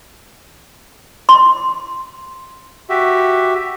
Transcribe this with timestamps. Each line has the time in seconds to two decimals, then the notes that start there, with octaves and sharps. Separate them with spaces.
1.29 C6
2.89 F#4 G4 E5